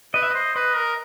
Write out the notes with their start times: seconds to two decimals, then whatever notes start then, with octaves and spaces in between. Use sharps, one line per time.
0.14 B4 D#5
0.23 E5
0.31 C5 D#5
0.56 B4 D#5
0.76 A#4